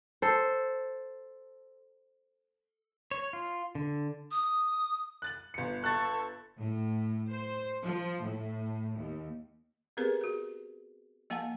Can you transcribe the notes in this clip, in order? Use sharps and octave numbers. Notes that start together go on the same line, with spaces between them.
A4 C5
C#5
F4
D3
D#6
F#6 A6 F#7
G1 C#7
A4 C#6 F#6 A6
A2
C5
F3
A2
D#2
B3 C4 G4 G#4 A#4 B4
F#4 G#4
F3 A#3 F5 F#5 G#5 A5